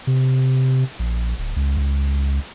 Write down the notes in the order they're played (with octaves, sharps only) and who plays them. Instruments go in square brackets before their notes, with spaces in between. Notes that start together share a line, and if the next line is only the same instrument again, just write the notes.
[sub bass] C3
A#1
D1
C#2
C#2